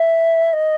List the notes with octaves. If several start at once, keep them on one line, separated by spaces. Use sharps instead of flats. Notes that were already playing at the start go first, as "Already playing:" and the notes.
Already playing: E5
D#5